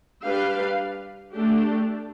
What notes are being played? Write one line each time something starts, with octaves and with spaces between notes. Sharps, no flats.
G3 D4 G4 B4 F5
A3 D4 G4